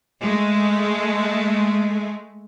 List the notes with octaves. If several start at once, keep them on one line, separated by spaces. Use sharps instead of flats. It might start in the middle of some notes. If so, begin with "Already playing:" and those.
G#3 A3